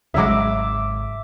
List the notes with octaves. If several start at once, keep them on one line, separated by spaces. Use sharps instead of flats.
D#1 G#1 C#3 F#3 G#3 E5 D6